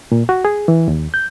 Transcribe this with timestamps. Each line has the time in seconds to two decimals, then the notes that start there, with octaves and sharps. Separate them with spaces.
0.12 A#2
0.29 F#4
0.45 G#4
0.68 E3
0.88 D#2
1.14 G6